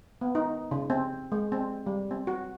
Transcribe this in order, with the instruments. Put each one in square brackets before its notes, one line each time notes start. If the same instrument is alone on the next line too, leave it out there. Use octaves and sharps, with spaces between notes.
[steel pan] B3
D#4
C#3
C4
G#3
C4
G3
C4
F#4